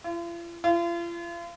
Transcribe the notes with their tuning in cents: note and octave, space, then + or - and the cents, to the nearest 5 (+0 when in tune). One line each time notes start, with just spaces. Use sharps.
F4 -45
F4 -40